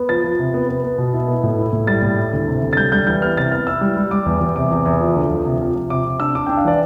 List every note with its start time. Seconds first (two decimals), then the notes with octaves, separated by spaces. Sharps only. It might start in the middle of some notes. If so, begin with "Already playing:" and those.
Already playing: B3
0.09 F3 A6
0.24 F3
0.39 C3
0.54 B3
0.69 B3
0.84 B3
0.98 B2
1.14 E4
1.28 B3
1.43 A2
1.59 E4
1.73 A2
1.87 G3 A6
2.02 A2
2.17 E4
2.33 D2
2.48 C3
2.62 D2
2.73 A6
2.77 G3 G6
2.92 G3 G6
3.07 E3 G6
3.22 B3 F6
3.37 C3 A6
3.52 B3 F6
3.67 E4 E6
3.81 G3
3.97 G3
4.11 G3 D6
4.26 E2
4.41 E2
4.56 C3 D6
4.71 E2
4.86 E2
5.00 F3
5.16 D2
5.30 F3
5.45 C3
5.61 F3
5.75 F3
5.90 C3 D6
6.05 C3
6.20 D4 E6
6.35 D4 D6
6.46 D4 G5
6.57 F5
6.65 E3 D5